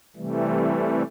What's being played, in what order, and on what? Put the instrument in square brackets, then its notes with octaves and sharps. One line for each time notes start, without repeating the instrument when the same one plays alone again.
[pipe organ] C3 E3 G3 A3